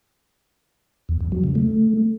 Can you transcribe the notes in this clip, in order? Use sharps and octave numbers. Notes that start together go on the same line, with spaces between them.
E2
E2
F#3
C#3
A3